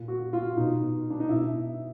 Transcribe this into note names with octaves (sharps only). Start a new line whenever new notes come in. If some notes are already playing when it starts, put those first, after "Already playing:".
Already playing: A#2
F#4
F4
B2 D#4
D4
D#4
B2 E4